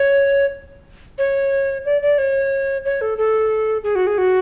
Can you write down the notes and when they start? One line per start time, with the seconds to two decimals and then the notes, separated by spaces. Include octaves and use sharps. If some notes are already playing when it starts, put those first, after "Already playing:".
Already playing: C#5
1.18 C#5
1.85 D5
2.02 D5
2.18 C#5
2.85 C#5
3.01 A4
3.18 A4
3.84 G#4
3.95 F#4
4.07 G#4
4.18 F#4